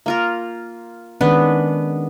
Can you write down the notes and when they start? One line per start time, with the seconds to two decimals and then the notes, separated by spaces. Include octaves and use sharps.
0.06 A#3 F4 A#4
1.21 D#3 G#3 B3 C#4 D4 B4